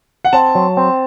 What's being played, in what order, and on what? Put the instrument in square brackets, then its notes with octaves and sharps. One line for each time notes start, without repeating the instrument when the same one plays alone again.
[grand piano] F#5
[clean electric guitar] C4 [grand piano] A5
[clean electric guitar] F#3
C4